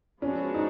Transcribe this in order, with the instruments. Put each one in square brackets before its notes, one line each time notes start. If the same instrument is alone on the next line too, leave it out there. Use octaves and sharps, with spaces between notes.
[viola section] F3 G#3 B3 D4 F#4 [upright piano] C#4
[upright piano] D#4